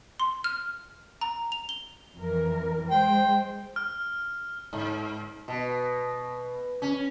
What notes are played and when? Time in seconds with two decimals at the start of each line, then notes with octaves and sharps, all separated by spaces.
0.20 C6
0.44 F6
1.21 A#5
1.52 F7
1.69 G7
2.15 F2 E3 A#4
2.90 G#3 C5 G5
3.76 F6
4.73 G#2
5.48 B2
6.82 C#4